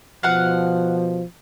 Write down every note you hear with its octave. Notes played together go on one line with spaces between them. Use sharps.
B2 F3 F5 F#5